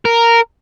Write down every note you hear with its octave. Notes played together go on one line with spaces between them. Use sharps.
A#4